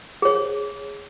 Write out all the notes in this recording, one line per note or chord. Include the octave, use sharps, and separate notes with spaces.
G#4 C#5